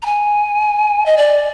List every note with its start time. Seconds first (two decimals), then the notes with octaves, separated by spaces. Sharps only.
0.02 A#5
0.06 G#5
1.06 D#5
1.17 D5